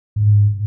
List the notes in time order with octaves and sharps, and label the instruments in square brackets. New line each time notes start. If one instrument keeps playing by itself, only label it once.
[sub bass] G#2